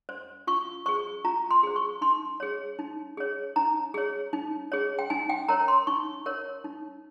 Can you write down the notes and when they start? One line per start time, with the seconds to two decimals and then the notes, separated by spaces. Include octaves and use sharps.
0.09 C5
0.47 F4 C#6
0.86 G#4 C5 C#6
1.25 F4 A#5
1.51 C6
1.63 G#4 C5
1.76 C#6
2.01 D#4 C6
2.40 G#4 C#5
2.79 D#4
3.17 G#4 C#5
3.56 D#4 A#5
3.94 G#4 C#5
4.33 D#4
4.72 G#4 C#5
4.99 G5
5.10 D#4 G#5
5.29 G5
5.48 A#4 C#5 A#5
5.68 C6
5.87 D#4 C#6
6.26 A#4 C#5
6.64 D#4